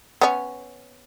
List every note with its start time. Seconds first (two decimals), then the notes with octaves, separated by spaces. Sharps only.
0.21 B3 C#4